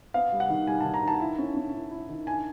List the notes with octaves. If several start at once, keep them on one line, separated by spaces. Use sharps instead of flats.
B3 F5
G3
F#5
D#3
G3 G#5
D#3 A5
A#5
D#3 A5
E4
C#4
C#4
E4
E4
D#3
D4 G#5